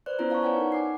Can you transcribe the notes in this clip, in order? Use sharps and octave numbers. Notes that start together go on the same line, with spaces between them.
B4 C5 D5 F#6
B3 C#4 E4 F4 C5 A#5
D5 F5 A5 A#5 C#6
B4 C#5 D5 F#5 G#5 G#6
D#4 A#4 F#5
G#5 D6 C7